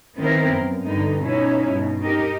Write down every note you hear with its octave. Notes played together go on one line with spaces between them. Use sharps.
D#3 B3 C4 E4 A#4 C5
F#2
G2 D3 B3 D#4
B2 C#4 D#4 E4
G2 B2
D#4 G4 A#4 D#5